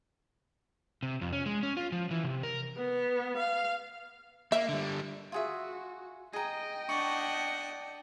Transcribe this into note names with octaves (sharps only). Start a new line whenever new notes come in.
C3
F2
C#4
G#3
C#4
F4
F3
E3
C3
A#4
B3
F5
A#3 E5
D3 G3
F4 F#4 G#4 E5
G#4 D#5 G5 A#5
D4 F#5 C#6